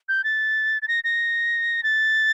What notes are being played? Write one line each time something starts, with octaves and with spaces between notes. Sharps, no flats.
G6
A6
A6
A#6
A#6
A6